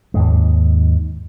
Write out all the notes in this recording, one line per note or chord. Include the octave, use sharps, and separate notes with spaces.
D#2 G#2 G#3